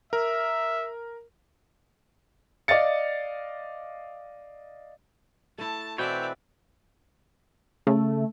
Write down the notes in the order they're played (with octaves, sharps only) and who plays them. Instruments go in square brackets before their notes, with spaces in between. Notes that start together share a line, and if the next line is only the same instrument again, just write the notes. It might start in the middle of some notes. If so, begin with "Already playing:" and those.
[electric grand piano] A#4 [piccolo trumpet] E5
[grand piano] D5 D#5 F5 A6 C#7
[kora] A3 E4 [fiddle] A5
[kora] B2 [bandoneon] E3 C4 B4 [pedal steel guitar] C#5 G5 [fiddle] D5 E5
[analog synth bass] C#3 [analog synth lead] A3